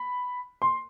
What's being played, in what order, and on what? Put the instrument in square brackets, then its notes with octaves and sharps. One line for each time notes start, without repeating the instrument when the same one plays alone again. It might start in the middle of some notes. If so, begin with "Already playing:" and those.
Already playing: [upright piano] B5
C6